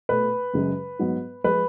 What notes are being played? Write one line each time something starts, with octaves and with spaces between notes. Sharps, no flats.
B2 A3 B4
F#2 C#3 G#3
G#2 F#3 B3
F3 G#3 B4